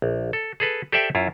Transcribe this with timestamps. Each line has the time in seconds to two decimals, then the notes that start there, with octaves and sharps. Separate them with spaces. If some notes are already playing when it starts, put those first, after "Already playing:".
0.02 A#1
0.33 A4
0.60 G#4 A4 B4
0.92 G4 A4 C5 D5 E5 G5
1.15 F#2 E4 F4